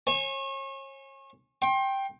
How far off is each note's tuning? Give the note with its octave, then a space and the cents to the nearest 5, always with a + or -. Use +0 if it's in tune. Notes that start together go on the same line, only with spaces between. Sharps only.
C#5 -35 G#5 +0
G5 +0 C6 +35